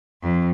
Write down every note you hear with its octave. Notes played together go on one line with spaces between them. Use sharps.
F2